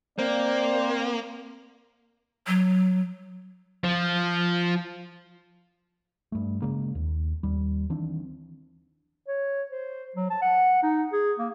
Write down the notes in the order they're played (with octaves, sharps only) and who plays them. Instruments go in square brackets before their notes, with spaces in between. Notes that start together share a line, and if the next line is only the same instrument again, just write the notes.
[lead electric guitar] A#3 [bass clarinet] C4 [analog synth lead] C5 [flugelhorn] D5
[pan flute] F#3
[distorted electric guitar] F3
[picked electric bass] G2 A3
C#3 G#3 A#3
D#2
D#2 G3
D#3 E3 C4 D4
[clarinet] C#5
C5
F#3
A5
F#5
D#4
G#4
A#3